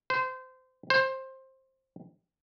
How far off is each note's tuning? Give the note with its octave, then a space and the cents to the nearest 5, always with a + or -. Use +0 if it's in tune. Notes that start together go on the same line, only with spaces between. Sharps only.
C5 -25
C5 +15